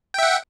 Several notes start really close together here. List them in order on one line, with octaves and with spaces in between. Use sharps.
G5 E5 F#5